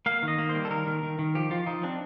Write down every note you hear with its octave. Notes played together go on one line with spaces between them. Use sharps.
A#3 F5
D#3
D#5
A#3
C5
G3
A4
D#3 A#4
D#3
D#3
D#3
F3 G4
F3 F4
F3 D#4
C4 D4